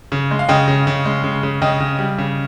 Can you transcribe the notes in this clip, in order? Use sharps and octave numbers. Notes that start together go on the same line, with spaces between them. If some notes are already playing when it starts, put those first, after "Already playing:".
C#3
G#3
F5
C#3 D#5 G5
C#3
C#3
G#3
C#3
C#3
C#3 D#5 G5
C#3
G3
C#3